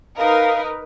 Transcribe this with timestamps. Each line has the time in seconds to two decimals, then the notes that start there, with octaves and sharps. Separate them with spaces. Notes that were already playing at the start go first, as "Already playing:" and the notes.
0.19 D#4 A#4 B4 F5